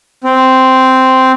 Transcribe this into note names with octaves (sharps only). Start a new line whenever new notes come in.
C4